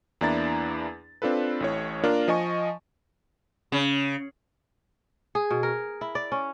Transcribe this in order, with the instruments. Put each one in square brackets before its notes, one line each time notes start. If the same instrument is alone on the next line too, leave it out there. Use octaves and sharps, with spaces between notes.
[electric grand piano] E2 A#3 D4 E4 A#5 A6
C4 D4 F4 A4 B4
A1 A2 C#5
A#3 D4 F4 A#4
F3 D#5 G#5 C#6
[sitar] C#3
[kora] G#4
B2
A#4
E4
D5
C#4